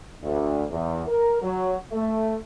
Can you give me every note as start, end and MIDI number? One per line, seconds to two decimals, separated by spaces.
0.23 0.65 38
0.70 1.03 40
1.08 1.40 70
1.42 1.74 54
1.92 2.35 57